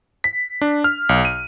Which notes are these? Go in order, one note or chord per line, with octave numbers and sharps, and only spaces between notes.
B6
D4
F6
B1
D#7